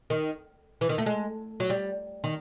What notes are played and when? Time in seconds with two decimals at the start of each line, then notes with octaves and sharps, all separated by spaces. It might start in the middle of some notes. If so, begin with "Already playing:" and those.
0.10 D#3
0.81 E3
0.89 D#3
0.98 A3
1.06 G#3
1.60 F#3
1.70 G3
2.24 D#3